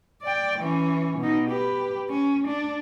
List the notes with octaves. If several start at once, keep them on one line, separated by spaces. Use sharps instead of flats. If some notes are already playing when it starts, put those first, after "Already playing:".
D5 G5
E3 C#4
B2 D#4
G4 B4
C#4
D4